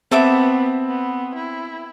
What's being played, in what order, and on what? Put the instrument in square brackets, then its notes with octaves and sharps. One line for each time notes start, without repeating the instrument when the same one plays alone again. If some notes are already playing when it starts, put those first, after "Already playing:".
[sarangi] B3 [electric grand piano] C4 [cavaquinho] A4 E5 D6
[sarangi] B3
E4